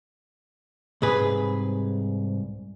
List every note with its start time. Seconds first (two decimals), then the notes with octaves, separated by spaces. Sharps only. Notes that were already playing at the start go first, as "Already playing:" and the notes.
1.02 C2 G#2 G#4 B4